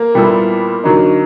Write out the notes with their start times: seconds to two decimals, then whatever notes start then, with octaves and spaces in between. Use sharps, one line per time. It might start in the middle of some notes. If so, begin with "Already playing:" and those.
Already playing: A#3
0.15 A#2 G3 B3 E4 A4
0.84 D3 F#3 A#3 D#4